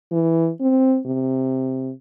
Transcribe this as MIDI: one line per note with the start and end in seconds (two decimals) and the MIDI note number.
0.11 0.50 52
0.60 0.99 60
1.06 1.92 48